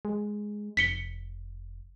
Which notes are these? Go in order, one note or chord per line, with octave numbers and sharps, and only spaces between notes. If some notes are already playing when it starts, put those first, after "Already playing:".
G#3
F1 B6 C#7 G7